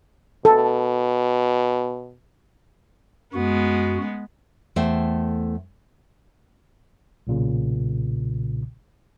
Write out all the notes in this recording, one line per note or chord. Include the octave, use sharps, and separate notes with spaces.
B2 A4
F#2 G#3 B3 F#4
E2 A3 A4 C5 E5 G5
B1 A#2 C#3